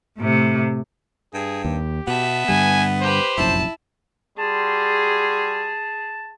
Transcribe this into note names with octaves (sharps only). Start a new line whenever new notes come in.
A2 C3
G2 G#4
D#2 G4
B2 B3 E5 A5
G2 D3 G3 G#5
G4 B4 C5
F1 A#1 F#2 E4 A5
G3 F#4 G#4 A5 C6